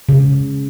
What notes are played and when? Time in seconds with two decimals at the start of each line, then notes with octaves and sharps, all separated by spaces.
0.09 C#3